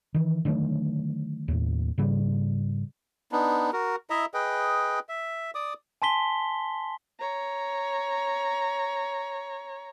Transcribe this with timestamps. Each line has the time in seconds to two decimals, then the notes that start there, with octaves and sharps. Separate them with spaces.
0.14 D#3 E3
0.45 D3 D#3 F#3 A3
1.48 D#2 A2
1.98 G#2 C#3 G3
3.32 B3 D4 D#4
3.73 F#4 A#4
4.10 E4 D#5 E5 A#5
4.34 G#4 B4 D#5 G5
5.09 E5
5.55 D5 D6 D#6
6.02 G#5 A5 C6 B6 G7
7.20 C#5 A#5